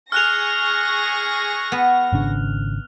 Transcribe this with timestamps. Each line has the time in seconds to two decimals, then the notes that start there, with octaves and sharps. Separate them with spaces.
0.12 G#4 C#6 F6 F#6 A#6 F7
1.72 B3
2.13 G#1 C#3 D4